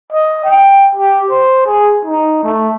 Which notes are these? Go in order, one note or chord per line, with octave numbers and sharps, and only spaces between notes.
D#5
G5
G4
C5
G#4
D#4
A3